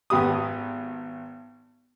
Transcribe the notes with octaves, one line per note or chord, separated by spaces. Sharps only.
G#1 B3 G4 D#6